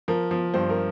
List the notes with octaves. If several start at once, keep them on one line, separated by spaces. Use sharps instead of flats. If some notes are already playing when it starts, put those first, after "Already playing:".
F3 A#4
F3
G2 C5
A#4